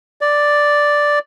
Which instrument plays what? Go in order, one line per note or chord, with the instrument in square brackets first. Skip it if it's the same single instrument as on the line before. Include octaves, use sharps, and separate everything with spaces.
[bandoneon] D5